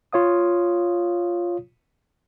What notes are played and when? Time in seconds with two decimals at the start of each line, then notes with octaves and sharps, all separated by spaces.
0.13 F4 C#5 F5 D#6